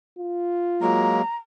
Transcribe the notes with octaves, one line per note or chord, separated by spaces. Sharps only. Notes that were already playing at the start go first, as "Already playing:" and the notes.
F4
F#3 G#3 A#3 A#5